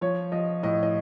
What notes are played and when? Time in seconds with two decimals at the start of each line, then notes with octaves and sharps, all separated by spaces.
0.01 F3 C#5
0.32 F3 D#5
0.63 A2 D#5
0.83 D#5